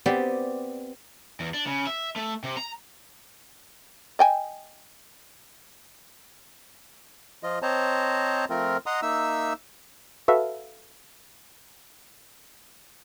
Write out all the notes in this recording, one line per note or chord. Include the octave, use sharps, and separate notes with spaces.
B3 C4 G4 D5
E2
D4
C#3
E5
A3
C3
A#5
D#5 G5 G#5
F3 F4 D#5
C4 C5 C#5 D#5 A5 A#5
F3 A3 C4 F4 A#4
D#5 F#5 A#5 C6 D#6
A#3 D#4 E5 E6
F#4 A4 B4 E5 F5